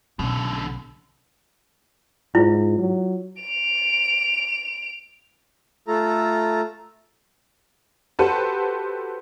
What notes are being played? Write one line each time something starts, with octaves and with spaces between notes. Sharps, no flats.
B1 B2 D3 C#4
G#2 E4 F4
F#3
D7 F7
A3 F4 A4 A#5
F#4 G4 A4 B4 C5